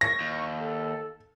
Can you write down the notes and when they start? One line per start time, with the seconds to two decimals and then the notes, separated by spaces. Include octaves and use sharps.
0.01 C#6 A#6
0.21 D#2
0.59 A4